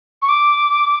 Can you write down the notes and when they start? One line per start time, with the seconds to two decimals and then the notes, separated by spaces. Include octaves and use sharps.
0.22 C#6
0.29 D6